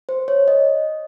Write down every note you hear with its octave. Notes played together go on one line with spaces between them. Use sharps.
C5
C#5
D#5